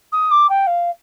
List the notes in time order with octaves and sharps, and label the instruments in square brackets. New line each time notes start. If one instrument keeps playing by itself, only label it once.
[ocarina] D#6
D6
G5
F5